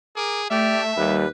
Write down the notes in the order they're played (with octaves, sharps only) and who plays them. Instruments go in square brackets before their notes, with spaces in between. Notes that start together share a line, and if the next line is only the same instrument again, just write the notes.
[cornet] G#4 [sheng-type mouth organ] A#4 D6
[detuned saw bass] A3 [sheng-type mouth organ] G4 D5 F6 [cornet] E5
[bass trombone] D#2 [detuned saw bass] G3 [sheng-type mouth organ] B4